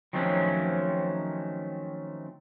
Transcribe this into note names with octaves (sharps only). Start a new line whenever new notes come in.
D#3 F3 F#3 A3 C4 C#4